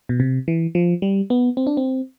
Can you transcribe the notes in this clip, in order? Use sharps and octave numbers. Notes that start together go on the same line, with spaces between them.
B2
C3
E3
F3
G3
B3
C4
D4
C4